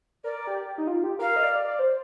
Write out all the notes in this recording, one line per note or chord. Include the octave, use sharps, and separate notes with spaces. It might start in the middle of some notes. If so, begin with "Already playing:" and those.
A#4 D5
G4
D#4
F4
G4
A#4 F5
D#5
D5
D5
C5